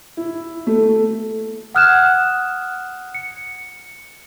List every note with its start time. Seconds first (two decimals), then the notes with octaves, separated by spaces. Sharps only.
0.17 E4
0.67 A3
1.75 F#5 D#6 F6 F#6 G#6 E7
3.14 C#7